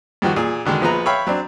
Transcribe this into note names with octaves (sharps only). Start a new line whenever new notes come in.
G2 D#3 F3 F#4
A#2 G#4
B2 D3 D#3 G#3
A#1 F3 B3 G#4 B4 A#5
C#5 E5 F5 G5 B5
F#3 C4 D4